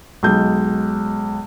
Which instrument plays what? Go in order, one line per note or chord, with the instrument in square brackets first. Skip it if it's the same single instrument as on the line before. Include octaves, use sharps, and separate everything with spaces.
[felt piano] B1 G#3 G6